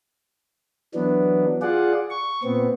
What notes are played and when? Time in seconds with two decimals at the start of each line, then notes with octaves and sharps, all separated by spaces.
0.94 E3 F#3 B3 D4
1.62 F4 G#4 D5 F#5
2.10 C#6
2.43 A#2 B3 C4